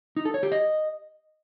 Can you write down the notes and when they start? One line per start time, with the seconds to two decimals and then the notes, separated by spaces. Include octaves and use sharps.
0.17 D#4
0.25 A4
0.34 C#5
0.43 G4
0.52 D#5